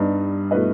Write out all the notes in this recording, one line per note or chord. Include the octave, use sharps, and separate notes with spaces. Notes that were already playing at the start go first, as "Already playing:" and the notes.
Already playing: G2 G3 B3 D#4
B2 A3 E4 B4 D#5